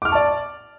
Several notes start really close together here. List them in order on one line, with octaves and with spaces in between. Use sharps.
D6 F6 C#6 A5 D5